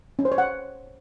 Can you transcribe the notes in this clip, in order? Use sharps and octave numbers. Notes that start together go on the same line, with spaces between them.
C#4
C5
C#5
F#5